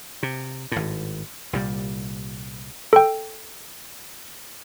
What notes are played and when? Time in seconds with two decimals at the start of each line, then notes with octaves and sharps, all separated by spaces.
0.23 C3
0.72 G#1 A2
1.53 C2 A#2 G3
2.93 A4 G5